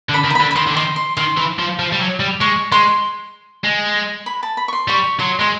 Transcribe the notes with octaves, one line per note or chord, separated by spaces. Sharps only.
D3
B5
D#3
A#5
B5
D3
B5
D#3 C6
D3
D#3 C6
C6
D#3 C6
E3
F3
F3
G3
F#3
G3
G#3 C#6
G#3 C6
G#3
B5
A5
B5
C#6
C6
G3 C#6
F#3 C6
G#3 C6